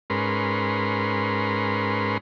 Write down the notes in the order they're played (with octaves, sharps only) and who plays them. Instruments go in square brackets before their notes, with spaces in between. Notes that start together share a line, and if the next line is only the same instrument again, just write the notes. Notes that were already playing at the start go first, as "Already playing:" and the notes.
[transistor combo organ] G#2 C#4 A#4 B4 C6